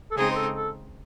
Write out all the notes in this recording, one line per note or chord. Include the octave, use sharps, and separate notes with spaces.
A4
C#3 G#3 C4 D#4 G#4
C5
A4
A4